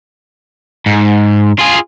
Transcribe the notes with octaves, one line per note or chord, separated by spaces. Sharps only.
G#2
F4 G#4